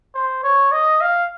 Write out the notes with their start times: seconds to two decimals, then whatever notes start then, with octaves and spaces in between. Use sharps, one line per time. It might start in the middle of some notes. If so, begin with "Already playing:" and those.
0.15 C5
0.44 C#5
0.72 D#5
1.01 F5